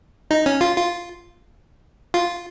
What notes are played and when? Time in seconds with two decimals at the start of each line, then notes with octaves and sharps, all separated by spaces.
0.31 D#4
0.46 C#4
0.61 F4
0.76 F4
2.14 F4